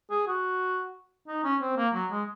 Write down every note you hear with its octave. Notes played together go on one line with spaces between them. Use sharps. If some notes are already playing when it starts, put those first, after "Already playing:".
G#4
F#4
D#4
C#4
C4
A#3
F#3
G#3